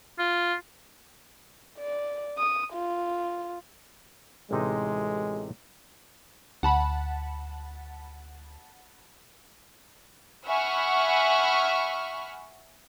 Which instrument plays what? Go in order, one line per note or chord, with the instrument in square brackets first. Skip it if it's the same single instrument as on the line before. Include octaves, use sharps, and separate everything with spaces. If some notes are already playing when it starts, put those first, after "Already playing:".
[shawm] F4
[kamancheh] D5
D#6
F4
[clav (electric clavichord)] A1 C3 D#4 [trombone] G#3
[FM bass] D2 [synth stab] F#5 A5 B5
[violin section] E5 F#5 G#5 B5 C#6 F6